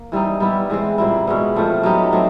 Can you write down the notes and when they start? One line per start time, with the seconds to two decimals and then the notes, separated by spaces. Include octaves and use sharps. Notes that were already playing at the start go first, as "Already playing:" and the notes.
Already playing: A#3
0.12 E3 G3 C4 D#4
0.40 G3 B3 E4 G4
0.70 E3 G#3 C4
0.98 A#2 G3 C4 E4
1.27 B2 G#3 B3 E4
1.56 F3 A3 C4
1.83 F#3 B3 D#4 G4
2.12 F#3 A3 C4